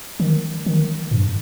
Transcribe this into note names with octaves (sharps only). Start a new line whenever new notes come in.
D#3
D#3
G2